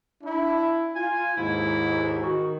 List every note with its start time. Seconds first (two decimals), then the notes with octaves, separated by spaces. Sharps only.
0.23 D4 E4
0.95 F4 G#5
1.37 D#2 G#2 E4
2.22 D#3 F#4